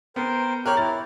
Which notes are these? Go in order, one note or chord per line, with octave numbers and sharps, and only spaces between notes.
B3 A#4 C5 G5
G4 A#4 C#5 F6 F#6
E4 A6